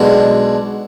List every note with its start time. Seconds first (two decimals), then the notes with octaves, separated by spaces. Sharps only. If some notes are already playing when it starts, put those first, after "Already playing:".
Already playing: B1 B2 G#3 D4